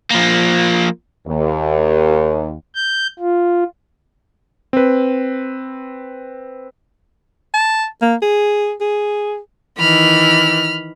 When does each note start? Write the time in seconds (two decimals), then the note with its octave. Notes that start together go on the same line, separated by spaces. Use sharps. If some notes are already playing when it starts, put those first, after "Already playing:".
0.11 F3 A#3
1.27 D#2
2.75 G6
3.19 F4
4.73 C4 B4
7.54 A5
8.02 A#3
8.22 G#4
8.81 G#4
9.79 D#3 E3 B5 F6